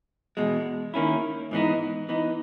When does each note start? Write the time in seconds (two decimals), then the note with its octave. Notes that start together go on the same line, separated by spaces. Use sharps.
0.37 E2 B2 G#3
0.94 D#3 A#3 C#4 E4
1.51 G#2 E3 B3 D#4
2.09 E3 B3 D#4